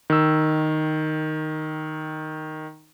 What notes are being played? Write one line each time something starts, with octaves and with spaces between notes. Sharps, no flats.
D#3 E6